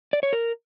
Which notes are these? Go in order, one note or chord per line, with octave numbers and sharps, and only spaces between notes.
D5
C#5
A#4